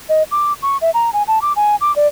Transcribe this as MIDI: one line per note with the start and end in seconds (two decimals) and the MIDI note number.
0.09 0.23 75
0.32 0.53 86
0.62 0.77 85
0.82 0.90 76
0.94 1.13 82
1.13 1.23 80
1.28 1.42 81
1.42 1.53 86
1.56 1.76 80
1.81 1.94 86
1.96 2.07 74